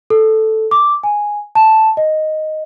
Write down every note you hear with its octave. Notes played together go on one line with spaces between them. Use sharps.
A4
D6
G#5
A5
D#5